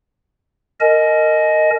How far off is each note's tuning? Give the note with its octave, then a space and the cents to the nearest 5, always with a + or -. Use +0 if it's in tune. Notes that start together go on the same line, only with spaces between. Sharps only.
A#4 -25 D#5 +0 G#5 +40